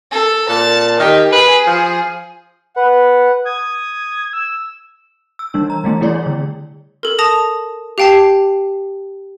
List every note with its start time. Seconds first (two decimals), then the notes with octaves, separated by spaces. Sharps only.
0.11 A4
0.49 A#2 A5
0.99 D#3 G4
1.32 G#4 B4
1.67 F3
2.76 B4 F#5
3.45 D#6 G#6
4.33 E6
5.39 E6
5.54 E3 G3 D4
5.70 A#5
5.84 E3 G3 A3 D4
6.01 G3 A3 E4 G#4 C#5 D5
6.27 D3
7.03 A4 A#4
7.19 A5 D#6 A#6 F7
7.98 G4 F5 G5 A5 C7